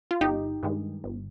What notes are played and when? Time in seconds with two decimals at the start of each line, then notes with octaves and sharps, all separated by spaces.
0.11 F4
0.21 G1 D#4 G4
0.63 G2 D#3 G#3
1.04 G1